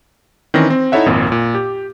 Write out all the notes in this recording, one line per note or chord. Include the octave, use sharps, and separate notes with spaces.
D#3 E3 C4 C#4 A#6
C4
D#4 E4 A4 C#5 E5 F#5
G#1 F2 A#2
A#2
G4